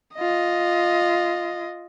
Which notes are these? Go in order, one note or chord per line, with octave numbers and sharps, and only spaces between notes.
F4 D#5